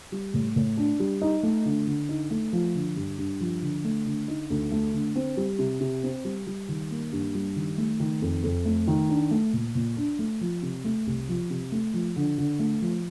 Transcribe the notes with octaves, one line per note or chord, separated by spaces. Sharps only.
G3
A2
A2
D4
G3
D#4
A3
D3
D3
D#4
A3
F3
D3
G2
G2
F3
D3
A3
D3
D#4
D2
A3
D3
C4
G3
C3
C3
C4
G3
G3
D#3
A#3
G2
G3
D#3
A3
D#3
F2
F2
A3
D#3
D4
A3
A#2
A#2
D4
A3
F3
C3
A3
C2
F3
C3
A3
F3
D3
D3
A3
F3